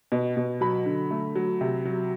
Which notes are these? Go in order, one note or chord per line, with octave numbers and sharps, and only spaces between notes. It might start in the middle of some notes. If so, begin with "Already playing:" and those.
B2
B2
F#3 B5
D3
A3
F#3
C3
F#3